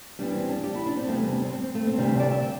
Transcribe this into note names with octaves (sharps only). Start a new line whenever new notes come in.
E2 E3 G3 D4
C4
D4
G4
E4
D4
C4
E2 C3 G3 A3
C4
D4
C4
C4
C4
A3
C4
D2 C3 E3 G3 D4
E5
C5
D5
E5
G5